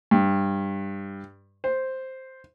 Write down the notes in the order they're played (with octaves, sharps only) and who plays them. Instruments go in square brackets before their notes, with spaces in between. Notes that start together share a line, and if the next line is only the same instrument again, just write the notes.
[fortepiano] G2
C5